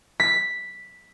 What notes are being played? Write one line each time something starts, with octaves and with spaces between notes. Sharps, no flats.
B6